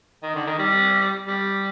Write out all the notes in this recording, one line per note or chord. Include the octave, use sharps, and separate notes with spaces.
D#3
D3
D#3
G3
G3